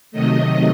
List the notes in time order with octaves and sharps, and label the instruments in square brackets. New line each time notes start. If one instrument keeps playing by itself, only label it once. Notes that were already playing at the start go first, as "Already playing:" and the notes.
[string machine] C3 D#3 F#3 A3 D#5